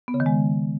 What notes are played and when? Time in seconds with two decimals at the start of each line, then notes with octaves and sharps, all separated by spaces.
0.08 B3
0.14 C#3
0.20 D#3
0.26 G#3